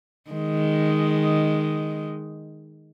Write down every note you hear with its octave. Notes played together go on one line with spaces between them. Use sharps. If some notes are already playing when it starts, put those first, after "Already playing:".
D#3 G#3